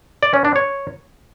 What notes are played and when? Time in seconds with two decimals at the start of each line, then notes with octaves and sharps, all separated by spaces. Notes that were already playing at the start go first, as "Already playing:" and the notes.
0.23 D5
0.34 C#4
0.45 D4
0.56 C#5